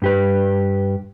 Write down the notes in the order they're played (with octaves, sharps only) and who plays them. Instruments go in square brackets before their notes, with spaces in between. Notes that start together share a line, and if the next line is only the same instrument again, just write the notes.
[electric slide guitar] G2 G4 B4